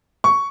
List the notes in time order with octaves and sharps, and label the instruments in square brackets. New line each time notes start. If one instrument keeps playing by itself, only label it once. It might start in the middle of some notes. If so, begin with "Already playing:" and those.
[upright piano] C#6